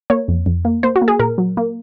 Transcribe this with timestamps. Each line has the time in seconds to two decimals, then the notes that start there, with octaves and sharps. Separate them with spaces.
0.10 A#3 C#5
0.28 F2
0.46 F2
0.65 A#3
0.83 A#3 C5
0.96 F#4
1.02 A#3
1.08 G#4
1.19 A#2 A#4
1.38 F#3
1.57 A#3